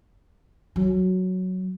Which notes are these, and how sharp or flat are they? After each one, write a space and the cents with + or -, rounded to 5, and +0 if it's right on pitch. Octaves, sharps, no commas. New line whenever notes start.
F#3 +0